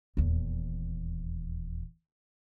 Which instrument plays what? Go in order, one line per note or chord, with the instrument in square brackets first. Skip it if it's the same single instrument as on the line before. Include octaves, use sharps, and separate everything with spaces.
[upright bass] D#1 E2